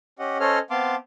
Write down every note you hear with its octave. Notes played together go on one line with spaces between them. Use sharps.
C#4 G4 D#5 F#5
C#4 A4 C5 C#5 D#5 F6
B3 C4 F5 A5 C6 D6